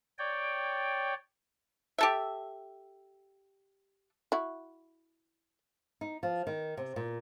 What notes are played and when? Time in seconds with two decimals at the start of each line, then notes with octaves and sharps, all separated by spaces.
0.19 C#5 D5 G5
1.98 G4 A4 E5
4.32 E4 F#4
6.01 D#4
6.23 F3
6.47 D#3
6.77 C3
6.96 A#2